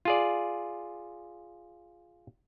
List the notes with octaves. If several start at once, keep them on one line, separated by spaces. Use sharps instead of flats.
F4 G#4 D5